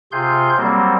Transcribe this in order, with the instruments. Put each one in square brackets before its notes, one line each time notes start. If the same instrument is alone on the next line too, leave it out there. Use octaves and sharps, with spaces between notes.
[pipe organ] C3 F4 G#4 C6 G6
F#3 G3 A#3 C4